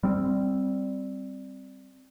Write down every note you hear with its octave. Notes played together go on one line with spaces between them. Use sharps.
G3 C4